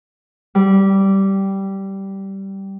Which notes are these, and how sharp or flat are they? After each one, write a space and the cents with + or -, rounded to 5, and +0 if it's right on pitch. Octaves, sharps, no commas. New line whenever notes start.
G3 -10